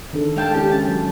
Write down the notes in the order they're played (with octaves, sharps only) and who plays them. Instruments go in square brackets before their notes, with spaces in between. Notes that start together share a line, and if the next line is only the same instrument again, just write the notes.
[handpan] D#3 D4 A4
[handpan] G#3 [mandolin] F5 G5 A5
[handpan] C#4 E4 [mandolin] G4
[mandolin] A5
[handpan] F#3